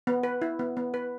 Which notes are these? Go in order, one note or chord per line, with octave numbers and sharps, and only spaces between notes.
B3
B4
E4
B3
B3
B4